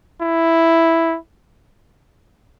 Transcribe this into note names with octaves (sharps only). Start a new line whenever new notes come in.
E4